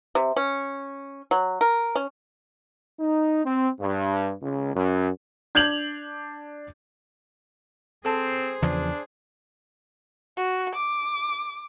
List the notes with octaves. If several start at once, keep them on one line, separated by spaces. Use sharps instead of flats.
C3
C#4
F#3
A#4
C#4
D#4
C4
G2
C#2
F#2
D4 G6 G#6 F7 F#7
C4 G#4 A4 C5 A5
E2 C#3 F3 D4
F#4
D6